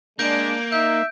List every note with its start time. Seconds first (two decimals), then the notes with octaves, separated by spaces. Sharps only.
0.19 G#3 A#3 D4 G6 D7
0.72 D#4 E5 G6